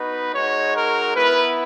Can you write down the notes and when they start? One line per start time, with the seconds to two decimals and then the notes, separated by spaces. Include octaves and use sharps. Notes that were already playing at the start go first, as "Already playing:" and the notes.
Already playing: B3 D#4 F#4 B4
0.33 G#3 D#4 F#4 C#5
0.75 A#4
1.15 B3 E4 B4